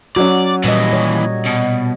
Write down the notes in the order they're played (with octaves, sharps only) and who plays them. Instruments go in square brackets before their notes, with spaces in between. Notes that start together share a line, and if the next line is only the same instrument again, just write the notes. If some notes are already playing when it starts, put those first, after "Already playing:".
[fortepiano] F#3 C#4 [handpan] F#4 [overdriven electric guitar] D5
[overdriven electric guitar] D#2 E3 [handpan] A#2 G3 D#5
[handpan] C#5
[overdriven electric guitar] B2